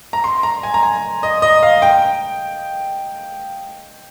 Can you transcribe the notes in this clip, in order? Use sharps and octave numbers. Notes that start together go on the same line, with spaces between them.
A#5
C6
A#5
G#5
A#5
G#5
D#5
D#5
F5
G5